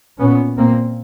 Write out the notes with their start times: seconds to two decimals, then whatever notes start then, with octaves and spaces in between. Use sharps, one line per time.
0.19 A#2 B3 C#4
0.57 A#2 A#3 C4